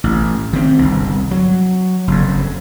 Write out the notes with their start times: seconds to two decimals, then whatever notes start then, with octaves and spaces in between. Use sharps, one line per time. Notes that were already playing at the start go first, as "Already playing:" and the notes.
0.04 A1
0.53 D#3 C4
0.78 G1 C2
1.31 F#3
2.08 F#1 F2